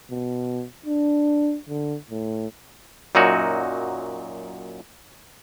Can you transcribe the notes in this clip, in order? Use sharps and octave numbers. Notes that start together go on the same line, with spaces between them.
B2
D4
D3
A2
F#2 A#2 F#3 D#4 F#4